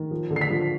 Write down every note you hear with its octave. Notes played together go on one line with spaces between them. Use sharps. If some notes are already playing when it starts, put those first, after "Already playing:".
Already playing: D#3
F3
D3
C7
B6
F3